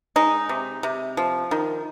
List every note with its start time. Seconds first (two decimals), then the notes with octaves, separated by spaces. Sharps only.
0.16 G#3 D#4
0.49 C3
0.83 C3
1.17 F3
1.51 D#3